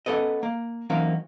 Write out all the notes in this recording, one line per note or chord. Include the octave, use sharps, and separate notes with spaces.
B3 C#4 A4 B4 D#5
A#3
E3 F#3 A#3 C4 C#4 D#4